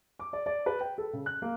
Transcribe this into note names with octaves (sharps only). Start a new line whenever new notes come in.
D6
D5
D5
B4
G5
A4
C#3
F#6
A#3